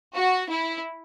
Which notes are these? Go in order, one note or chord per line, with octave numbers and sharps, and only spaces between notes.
F#4
E4